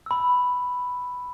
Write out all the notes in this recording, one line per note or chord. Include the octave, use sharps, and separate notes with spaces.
B5 E6